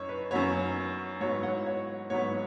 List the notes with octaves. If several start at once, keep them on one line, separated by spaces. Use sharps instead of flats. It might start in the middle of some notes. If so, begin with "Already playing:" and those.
Already playing: F#2 C#5 D#5
B4
F#2 F#3 B3 C#5
G#2 F#3 B3 C#5
C#5 F#5
C#5
G#2 F#3 B3 C#5